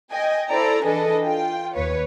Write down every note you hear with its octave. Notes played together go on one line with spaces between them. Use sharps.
D#5 G5 G#5
E4 A4 C5 D5 A#5
E3 D4 G#4 A4 B4 D#5
F4 G5
D#2 B4 C#5